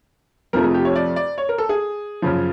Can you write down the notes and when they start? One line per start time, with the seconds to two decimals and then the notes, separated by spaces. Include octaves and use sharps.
0.53 F2 C3 F3 A3 A#4
0.63 G#4
0.74 G4
0.85 C#5
0.96 D5
1.16 D5
1.38 C#5
1.49 A#4
1.58 A4
1.69 G#4
2.22 F#2 C#3 F3